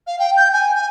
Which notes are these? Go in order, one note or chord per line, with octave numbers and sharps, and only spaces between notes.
F5
G5
G6
G#5
G#5